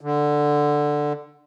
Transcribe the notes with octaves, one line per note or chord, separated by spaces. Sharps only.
D3